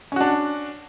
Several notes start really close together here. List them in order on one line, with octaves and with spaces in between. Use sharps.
C#4 F#4 D4